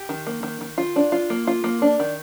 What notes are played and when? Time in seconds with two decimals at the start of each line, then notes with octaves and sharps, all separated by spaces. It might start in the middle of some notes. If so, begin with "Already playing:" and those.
Already playing: G4
0.09 D#3
0.27 A#3
0.43 D#3
0.61 D#3
0.78 F4
0.96 D4
1.12 F4
1.30 A#3
1.47 F4
1.64 A#3
1.82 D4
2.00 D#3